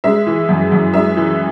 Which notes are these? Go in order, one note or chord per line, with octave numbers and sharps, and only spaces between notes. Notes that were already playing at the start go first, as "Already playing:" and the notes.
G#3 E5
E3
F#2
F#2
G#3 E5
E3